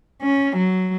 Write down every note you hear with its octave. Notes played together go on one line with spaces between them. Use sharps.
C#4
F#3